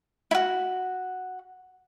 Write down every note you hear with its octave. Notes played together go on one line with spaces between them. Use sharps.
E4 F#4